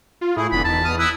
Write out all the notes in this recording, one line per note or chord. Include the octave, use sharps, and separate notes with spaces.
F4
A2 A3 E4 G#4
F1 D3 E3 B3 B5
E2 D#3 A5
B2 D#6 F6
E4 D#6 E6 F#6